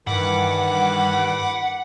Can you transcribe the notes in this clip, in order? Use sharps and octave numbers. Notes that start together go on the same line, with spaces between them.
G2 D#3 E3 F#5 B5 D6